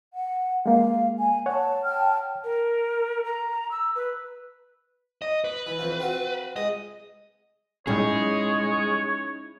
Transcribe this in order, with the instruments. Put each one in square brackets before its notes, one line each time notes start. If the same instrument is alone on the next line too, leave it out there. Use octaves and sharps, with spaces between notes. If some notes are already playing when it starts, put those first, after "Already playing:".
[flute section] F#5
[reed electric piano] G#3 A#3 [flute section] F5
[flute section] G#5
[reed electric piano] C#5 F#5 [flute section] A5
[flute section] G5 A5 F6
[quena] A#4
A#5
E6
B4
[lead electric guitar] D#5
B4
[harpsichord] E3
F2 E3 F3
C4 F4 F#4
[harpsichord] G#3 [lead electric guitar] D#5
[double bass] G#3 [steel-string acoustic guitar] C#4 D#4 E4 [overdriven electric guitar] G#4 [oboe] C#5